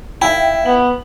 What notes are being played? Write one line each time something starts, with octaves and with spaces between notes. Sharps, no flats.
E4 E5 F5 G5
B3 F#7